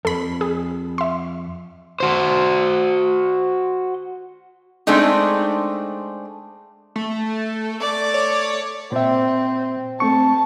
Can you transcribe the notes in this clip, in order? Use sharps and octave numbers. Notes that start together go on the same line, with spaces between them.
F2 A4 B5
G#4
E5 C6
F#4 C5
G#3 A3 C4 D4 D#4
A3
A3 D5
C#5
A#2 C4 E5
A3 C4 A5 C#6